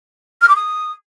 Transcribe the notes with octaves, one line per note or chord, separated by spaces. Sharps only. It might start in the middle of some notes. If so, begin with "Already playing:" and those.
F6
D6
D#6